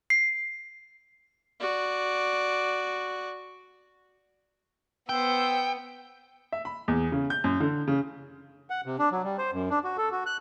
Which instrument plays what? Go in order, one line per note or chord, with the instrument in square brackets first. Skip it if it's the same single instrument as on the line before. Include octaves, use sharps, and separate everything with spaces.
[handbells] C7
[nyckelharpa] F#4 D5
[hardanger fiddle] B3 [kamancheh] C5 E6 [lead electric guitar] G5
[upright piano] E5
B5
E2
C#3
G6
F#2
D3
C#3
[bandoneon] F#5
C3
D4
F#3
G3
C5
F#2
D4
F#4
A4
F#4
F#6